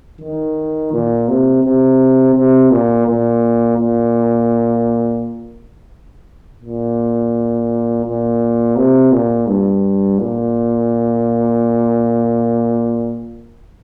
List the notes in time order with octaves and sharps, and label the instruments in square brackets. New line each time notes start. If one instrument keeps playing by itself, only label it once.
[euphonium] D#3
A#2
C3
C3
C3
A#2
A#2
A#2
A#2
A#2
C3
A#2
G2
A#2